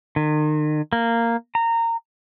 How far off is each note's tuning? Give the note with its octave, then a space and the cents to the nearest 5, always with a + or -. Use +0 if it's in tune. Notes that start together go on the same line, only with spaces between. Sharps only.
D#3 -40
A#3 -10
A#5 -20